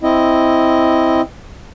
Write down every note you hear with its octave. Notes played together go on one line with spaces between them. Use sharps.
C4 E4 D#5